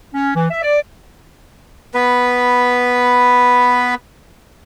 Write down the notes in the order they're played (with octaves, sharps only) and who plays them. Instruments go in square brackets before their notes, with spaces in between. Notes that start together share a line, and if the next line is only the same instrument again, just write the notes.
[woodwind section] C#4
E3
E5
D5
[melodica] B3 B4